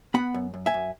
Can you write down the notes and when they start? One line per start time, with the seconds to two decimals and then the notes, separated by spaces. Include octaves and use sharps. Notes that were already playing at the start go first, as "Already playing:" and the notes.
0.14 B3 F#5 B5
0.34 F#2
0.54 F#2
0.66 E5 G#5
0.74 F#2